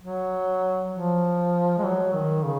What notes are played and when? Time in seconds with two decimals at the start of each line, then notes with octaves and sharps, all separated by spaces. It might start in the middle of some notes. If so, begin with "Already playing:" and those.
0.01 F#3
0.92 F3
1.78 G#3
1.84 F#3
2.13 D#3
2.44 C#3